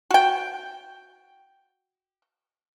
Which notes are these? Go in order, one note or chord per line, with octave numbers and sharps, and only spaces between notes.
F#4 G5